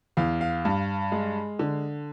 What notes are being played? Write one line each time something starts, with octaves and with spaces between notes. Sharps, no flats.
E2 F5
F5
G2
G#3
D3